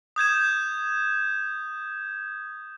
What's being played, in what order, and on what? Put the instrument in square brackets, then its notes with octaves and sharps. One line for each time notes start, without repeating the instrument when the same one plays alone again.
[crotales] D#6 G6 G#6 E7